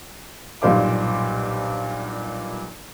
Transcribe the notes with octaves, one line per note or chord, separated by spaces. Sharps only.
B1 G2 A#2 C5 F5 D6